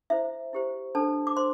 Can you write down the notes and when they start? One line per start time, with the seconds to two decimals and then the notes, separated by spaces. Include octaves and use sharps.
0.10 E4 C5 E5
0.53 E4 G4 C5
0.95 D4 A4 C5 A5
1.27 D6
1.37 C5 C6